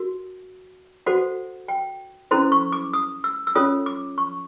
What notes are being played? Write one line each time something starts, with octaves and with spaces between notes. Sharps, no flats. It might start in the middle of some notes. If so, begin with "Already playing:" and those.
Already playing: F#4 A#4
F#4 A4 C5 F#5
G5
C#4 E4 A4 C5 C6
C#6
D6
D#6
E6
E6
C#4 F4 A4 C#5 D#6
D6
C#6